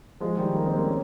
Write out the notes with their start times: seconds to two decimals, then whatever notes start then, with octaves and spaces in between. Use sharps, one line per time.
0.20 F3 G#3
0.37 D#3 G3
0.55 G3 A#3
0.66 G#3 C4
0.77 A#3 C#4
0.88 C#4